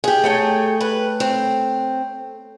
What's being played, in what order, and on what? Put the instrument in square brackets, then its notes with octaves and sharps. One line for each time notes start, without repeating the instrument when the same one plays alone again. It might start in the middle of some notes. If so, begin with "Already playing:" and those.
[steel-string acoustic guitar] G4 G#4
[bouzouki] A3 C#5 G5
[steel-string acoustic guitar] B4
C4